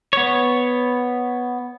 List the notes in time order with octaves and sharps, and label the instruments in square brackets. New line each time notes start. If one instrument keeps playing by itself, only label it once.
[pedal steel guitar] B3 C#5